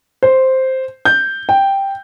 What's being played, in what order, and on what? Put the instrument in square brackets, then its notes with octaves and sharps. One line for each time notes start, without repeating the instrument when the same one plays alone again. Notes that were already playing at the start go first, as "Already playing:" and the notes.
[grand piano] C5
G6
G5